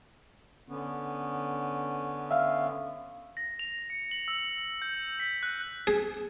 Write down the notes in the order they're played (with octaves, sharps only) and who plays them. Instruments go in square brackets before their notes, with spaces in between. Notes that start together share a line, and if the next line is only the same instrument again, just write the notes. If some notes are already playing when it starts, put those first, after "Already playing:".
[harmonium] D3 B3 C#4
[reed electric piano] E5 F5
[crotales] A#6
F7
C#7
F#7
E6
F#7
G6
B6
F#6
[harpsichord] G#4